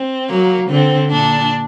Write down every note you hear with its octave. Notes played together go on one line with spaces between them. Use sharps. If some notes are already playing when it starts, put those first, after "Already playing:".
Already playing: C4
F#3 A#3
D3 C4
A#2 D4